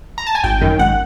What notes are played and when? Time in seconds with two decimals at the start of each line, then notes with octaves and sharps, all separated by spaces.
0.18 A#5
0.27 A5
0.35 G#5
0.44 G#1 G5
0.61 F#2 D#3
0.79 G#1 F#5